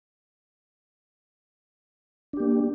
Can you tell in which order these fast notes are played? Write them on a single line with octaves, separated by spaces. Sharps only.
D4 G4 A#3